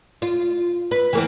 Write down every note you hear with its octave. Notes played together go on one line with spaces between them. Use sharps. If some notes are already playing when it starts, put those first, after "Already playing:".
F4
B4
E3 A#3 C4